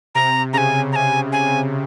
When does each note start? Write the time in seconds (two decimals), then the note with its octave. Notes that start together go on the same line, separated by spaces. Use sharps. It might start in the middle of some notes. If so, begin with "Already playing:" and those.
0.15 C3 A#5
0.53 C#3 G#5 A#5
0.92 A#5
0.96 G#5
1.32 G#5